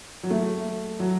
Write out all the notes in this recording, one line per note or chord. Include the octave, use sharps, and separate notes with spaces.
F#3
A3
F#3